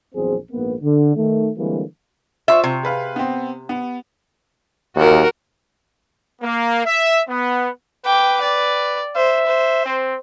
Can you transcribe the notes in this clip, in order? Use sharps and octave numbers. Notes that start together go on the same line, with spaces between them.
A#1 E2 F#3 C4 G#4 C5
A#1 G#2 A#3 B3
D3
D#3 A3
D3 E3 G3 G#3 A#3 C4
F4 C5 E5 C#6
C3
G#4 B4 F5
B3 C4
B3
D#2 F#4 A#4
A#3
E5
B3
B4 G5 D6
D5
C5 E5
C5
C4